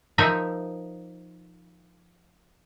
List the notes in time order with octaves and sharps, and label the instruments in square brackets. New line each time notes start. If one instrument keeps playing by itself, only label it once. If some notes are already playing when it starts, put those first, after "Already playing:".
[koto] F3 D#4 A#4 E5